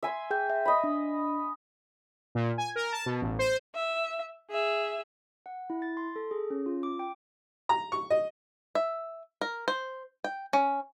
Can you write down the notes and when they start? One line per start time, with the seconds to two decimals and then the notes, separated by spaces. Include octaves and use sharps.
0.03 E5 G#5 C6
0.31 G#4 G5 G6
0.50 E5
0.65 D#5 B5
0.84 D4
2.35 A#2
2.58 G#5
2.76 A#4
2.92 A5
3.06 B2
3.22 A1
3.39 C5
3.75 E5
4.50 G#4 E5
5.46 F#5
5.70 E4
5.82 A6
5.97 C6
6.16 A4
6.31 G#4
6.50 C#4
6.66 F4
6.83 D6
6.99 G5
7.69 A#5
7.92 C#6
8.10 D#5
8.75 E5
9.41 A#4
9.68 C5
10.24 G5
10.53 C#4